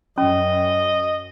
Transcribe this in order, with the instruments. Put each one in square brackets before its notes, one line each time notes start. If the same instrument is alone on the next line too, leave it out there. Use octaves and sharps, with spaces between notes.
[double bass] F#2 [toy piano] C#4 [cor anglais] D#5